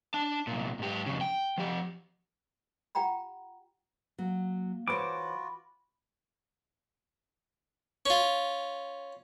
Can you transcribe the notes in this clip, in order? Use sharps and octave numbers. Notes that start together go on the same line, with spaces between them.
D4 A5
C2 A#2
G#2 G4
F2 C#3
G5
F3 G4
F4 G4 F#5 G5 A#5 B5
F#3 A#3
E3 F4 F#4 C5 C#5 B5 D6
C#4 F4